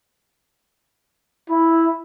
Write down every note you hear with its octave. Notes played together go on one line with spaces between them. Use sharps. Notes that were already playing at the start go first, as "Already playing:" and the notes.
E4